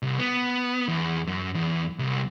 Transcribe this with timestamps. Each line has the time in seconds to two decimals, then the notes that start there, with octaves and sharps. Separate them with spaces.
0.02 C2
0.19 B3
0.88 E2
1.27 F#2
1.55 E2
1.99 C2